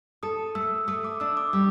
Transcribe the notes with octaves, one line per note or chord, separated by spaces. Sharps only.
A4 D#6
A3 E6
A3 D#6
D6
D4 E6
D6
G3